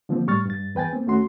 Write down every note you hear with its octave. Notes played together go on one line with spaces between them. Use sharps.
D3 F3 A#3 C4
A2 G3 C#6 F6 A6
G2 A6
E2 B4 G5 G#5 A6
A#3 C4
D#2 A3 C#4 F#4 C6